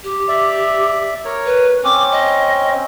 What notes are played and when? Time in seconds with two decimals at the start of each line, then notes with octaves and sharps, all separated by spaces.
0.03 G4
0.28 D5 E5
1.25 A#4 C#5
1.46 B4
1.84 C4 C#4 D6
2.12 D#5